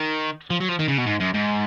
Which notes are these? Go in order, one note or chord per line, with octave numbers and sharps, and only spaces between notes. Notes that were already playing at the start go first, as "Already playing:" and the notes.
Already playing: D#3
F3
F#3
F3
D#3
C#3
B2
G#2
F#2
G#2